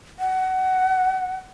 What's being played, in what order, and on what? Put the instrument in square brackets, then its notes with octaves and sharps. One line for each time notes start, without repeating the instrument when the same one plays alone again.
[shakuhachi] F#5